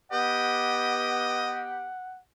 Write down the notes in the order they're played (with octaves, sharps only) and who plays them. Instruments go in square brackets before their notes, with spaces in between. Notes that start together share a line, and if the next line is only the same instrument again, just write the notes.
[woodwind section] B3 G4 [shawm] D#5 [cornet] F#5